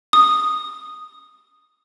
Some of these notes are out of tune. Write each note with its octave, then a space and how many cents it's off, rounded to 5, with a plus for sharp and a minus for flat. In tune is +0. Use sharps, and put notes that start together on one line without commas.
D#6 -10